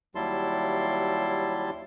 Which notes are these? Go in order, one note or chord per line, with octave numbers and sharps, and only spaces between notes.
D#2 F#3 G3 E4 A5 C6